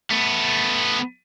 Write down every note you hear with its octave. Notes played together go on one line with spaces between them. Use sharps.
A3 B3